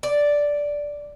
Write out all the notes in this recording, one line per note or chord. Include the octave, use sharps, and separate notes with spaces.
D5